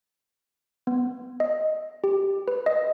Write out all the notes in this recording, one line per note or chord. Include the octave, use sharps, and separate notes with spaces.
B3
D#5
G4
B4
D#5